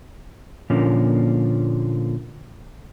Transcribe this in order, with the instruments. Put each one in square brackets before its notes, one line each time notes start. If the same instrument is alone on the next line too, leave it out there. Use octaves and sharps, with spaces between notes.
[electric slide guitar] A#2 D3 F3 A#3 C#4